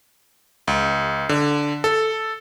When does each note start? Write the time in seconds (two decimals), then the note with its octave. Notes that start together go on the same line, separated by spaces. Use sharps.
0.68 C#2
1.29 D3
1.84 A4